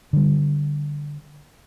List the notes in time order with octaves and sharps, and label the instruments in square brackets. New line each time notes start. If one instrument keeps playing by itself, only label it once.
[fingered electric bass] D3 G3